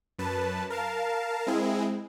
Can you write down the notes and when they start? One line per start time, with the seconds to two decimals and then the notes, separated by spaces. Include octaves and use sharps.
0.19 F#2 B4 A5
0.70 A#4 F5 A5
1.47 G#3 C4 E4 G#4